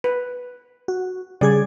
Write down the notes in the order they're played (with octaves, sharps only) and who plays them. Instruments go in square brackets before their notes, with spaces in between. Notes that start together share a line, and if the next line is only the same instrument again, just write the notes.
[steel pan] B4
[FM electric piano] F#4
[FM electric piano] C#3 G#4 G#6 [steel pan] G3 D5